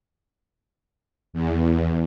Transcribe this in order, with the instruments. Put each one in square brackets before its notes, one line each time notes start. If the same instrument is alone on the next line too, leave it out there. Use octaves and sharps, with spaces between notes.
[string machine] E2